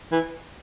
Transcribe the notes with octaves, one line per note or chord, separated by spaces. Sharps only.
E3